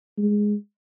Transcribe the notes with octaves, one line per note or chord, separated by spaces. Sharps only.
G#3